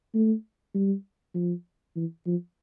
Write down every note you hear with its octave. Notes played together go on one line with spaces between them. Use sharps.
A3
G3
F3
E3
F3